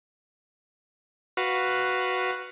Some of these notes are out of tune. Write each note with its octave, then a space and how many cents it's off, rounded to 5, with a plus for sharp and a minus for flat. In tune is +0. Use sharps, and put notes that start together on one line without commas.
F#4 +0 B4 +0 F5 -5